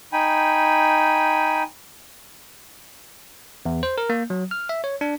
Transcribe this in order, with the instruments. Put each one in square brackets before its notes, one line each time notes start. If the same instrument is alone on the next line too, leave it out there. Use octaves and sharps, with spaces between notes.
[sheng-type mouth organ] D#4 G5 G#5 B5
[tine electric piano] E2
C5
A#4
A#3
F#3
F6
E5
C#5
D4